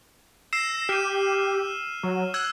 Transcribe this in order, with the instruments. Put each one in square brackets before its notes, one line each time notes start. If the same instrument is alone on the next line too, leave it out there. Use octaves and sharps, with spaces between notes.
[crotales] E6 C7 E7 [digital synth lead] A#6
[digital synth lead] G4 [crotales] F6 C7 D#7
[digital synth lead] F#3
[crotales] E6 G#6 [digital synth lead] F#6